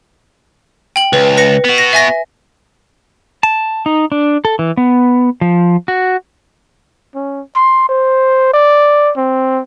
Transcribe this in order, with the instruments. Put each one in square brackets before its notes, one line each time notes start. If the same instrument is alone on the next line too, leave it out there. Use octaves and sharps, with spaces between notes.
[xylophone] G5 F#7
[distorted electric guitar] C#2 [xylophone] B4
[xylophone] B4 A#6 C#7
[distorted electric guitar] B3 F#4
[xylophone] A#6
E5 G#5 A#6
[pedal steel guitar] A5
D#4
D4
A4
E3
B3
F3
F#4
[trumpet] C#4
C6
C5
D5
C4